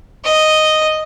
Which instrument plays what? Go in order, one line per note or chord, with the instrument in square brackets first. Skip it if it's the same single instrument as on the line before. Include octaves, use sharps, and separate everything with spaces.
[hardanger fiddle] D#5